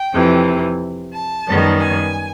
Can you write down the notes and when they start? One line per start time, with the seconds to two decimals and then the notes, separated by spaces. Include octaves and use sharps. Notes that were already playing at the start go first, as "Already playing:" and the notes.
Already playing: G5
0.12 F2 C3 E3
1.13 A5
1.47 F#2 D#3 G3 B3
1.80 G#5